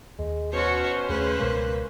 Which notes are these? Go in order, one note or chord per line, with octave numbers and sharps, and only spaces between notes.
D#2 G#3
B2 C#4 F#4 C5 C#5
D#2 C#3 A3 B4
C#2 B2 G#3 A#3